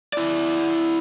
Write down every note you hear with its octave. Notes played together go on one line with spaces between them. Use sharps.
E4 D5